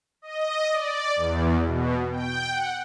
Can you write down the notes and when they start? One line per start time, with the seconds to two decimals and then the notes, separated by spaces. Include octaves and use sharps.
0.22 D#5
0.70 D5
1.16 E2
1.65 B2
2.11 G5
2.50 F#5